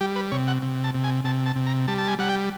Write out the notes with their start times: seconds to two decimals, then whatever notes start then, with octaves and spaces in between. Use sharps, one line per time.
0.01 G3 G4
0.16 B4
0.32 C3 C#5
0.47 F#5
0.62 C3
0.84 A5
0.95 C3
1.04 G#5
1.24 C3 A5
1.46 A5
1.56 C3
1.67 A#5
1.88 G3 A5
1.98 A5
2.08 G#5
2.19 G3 F#5
2.29 G5